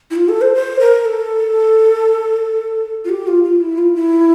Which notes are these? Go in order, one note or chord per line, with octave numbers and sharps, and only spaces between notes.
E4
F4
A4
C5
C5
A#4
A4
F4
G4
F4
F4
E4
F4
E4